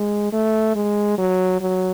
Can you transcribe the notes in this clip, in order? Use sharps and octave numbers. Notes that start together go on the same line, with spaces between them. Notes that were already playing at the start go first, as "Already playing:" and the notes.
Already playing: G#3
A3
G#3
F#3
F#3